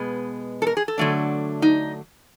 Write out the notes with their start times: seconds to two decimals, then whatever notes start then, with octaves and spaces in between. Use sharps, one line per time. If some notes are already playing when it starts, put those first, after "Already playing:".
Already playing: B2 G#3 B3
0.62 A4
0.67 A#4
0.77 G#4
0.88 A4
0.98 D3 F#3 A3 D4
1.62 D#4